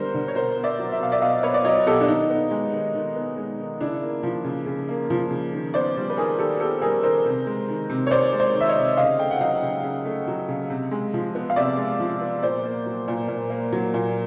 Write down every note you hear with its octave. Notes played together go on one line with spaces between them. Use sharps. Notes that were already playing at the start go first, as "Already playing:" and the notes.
Already playing: D3 G3 B3 A#4 C5
D3
C#5
B2 A#4 C5
B3
D5 E5
F#3
E5
B2 F5
D5 E5
B2 D#5 F5
B3 B4 C#5
D5
F#3 C#5 D#5
B2 G4 A4
D4
D#3 D#4
B3
G#3
D#3
D#3
B3
G#3
D#3
C#3 D4 E4
A#3
F3
C#3
C#3
A#3
F3
C#3
D#3
B3 C5 D5
G3
B4
D#3 G#4 A#4
D#3 G4 A4
B3 G4 A4
G3 G#4 A#4
D#3 A#4 C5
C3
G#3
D#3
C3
C#5
C3 C5 D5
G#3
C5 D5
D#3
E5
C#5 D#5
C3
C#3 D#5 F5
A3 G5
F#5
F#3 D#5 F5
C#3
C#3
A3
F#3
C#3
C3
G#3
F3
B3
F5
C3 D5 E5
G#3
F3
B3
A#2 C5 D5
A#3
F#3
A#2
A#2
A#3
F#3
A#2